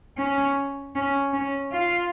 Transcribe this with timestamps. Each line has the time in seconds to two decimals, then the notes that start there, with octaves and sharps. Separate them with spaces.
0.18 C#4
0.95 C#4
1.33 C#4
1.72 F4